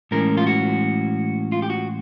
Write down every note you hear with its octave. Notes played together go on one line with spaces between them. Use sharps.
A2 E3 G#3 C#4 E4 A#4
F4
F#4
F4
G4
F#4